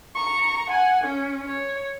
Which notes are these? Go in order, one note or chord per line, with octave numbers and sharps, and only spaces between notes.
A#5 C#6
F#5 G#5
C#4
C#5